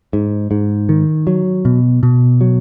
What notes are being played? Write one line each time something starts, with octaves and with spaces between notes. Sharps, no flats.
G#2
G#2
D#3
F#3
B2
B2
F#3